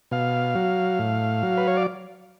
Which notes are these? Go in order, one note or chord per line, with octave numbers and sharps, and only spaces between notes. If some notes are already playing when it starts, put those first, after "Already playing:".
B2 F5
F#3
A2
F#3
B4
C#5
D5